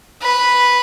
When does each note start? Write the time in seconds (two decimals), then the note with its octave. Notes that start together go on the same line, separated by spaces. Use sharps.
0.22 B4